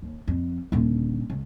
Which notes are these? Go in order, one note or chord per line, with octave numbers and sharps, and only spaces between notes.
D#2
F2
D#1 D3
C#2